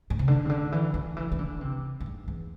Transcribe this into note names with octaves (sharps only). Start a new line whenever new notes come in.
A2
C3
D3
C3
D3
E3
D3
E3
E3
D3
C3
G2
E2
E2